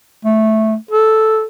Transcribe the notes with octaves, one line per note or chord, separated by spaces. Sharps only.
A3
A4